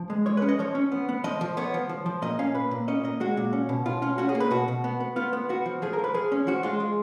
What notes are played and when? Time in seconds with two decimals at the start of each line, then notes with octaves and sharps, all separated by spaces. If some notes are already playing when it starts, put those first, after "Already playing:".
Already playing: F3
0.10 G#3
0.26 G#3 C#5
0.37 C#4 B4
0.49 D#5
0.59 F3 C#5
0.75 C#4
0.92 B3
1.09 B3
1.24 F3 D#5
1.41 F3
1.57 B3 C#5
1.74 F3
1.89 F3
2.06 F3
2.22 A#2 D#5
2.39 C#4 F5
2.55 A#2 B4
2.71 A#2
2.88 C#4 D#5
3.04 A#2 D#5
3.20 G#3 F#4
3.37 A#2
3.53 C#4
3.69 B2
3.86 B2 F4
4.02 C#4 F4
4.18 C#4 F#4
4.29 G#4
4.35 A#3
4.40 B4
4.51 B2 F#4
4.68 B2
4.84 B3
5.00 B3
5.16 B3 F4
5.33 B3
5.49 B3 F#4
5.66 F3
5.82 F3 G#4
5.93 A#4
5.99 F3
6.04 B4
6.14 F3 G#4
6.32 C#4
6.47 F3 F#4
6.63 G#3 F4
6.80 G#3